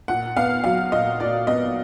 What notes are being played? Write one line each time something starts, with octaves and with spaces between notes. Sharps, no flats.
A#2 F#5
B3 F5
F#3 F5
A#2 D#5
A#2 D5
B3 D#5